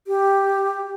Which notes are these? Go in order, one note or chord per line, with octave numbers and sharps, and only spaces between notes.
G4